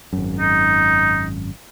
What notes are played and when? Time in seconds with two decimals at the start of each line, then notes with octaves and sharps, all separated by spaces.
0.13 G#1 F#2
0.39 D#4